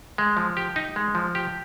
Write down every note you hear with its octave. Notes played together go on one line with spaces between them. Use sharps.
G#3
F3
G4
D#4
G#3
F3
G4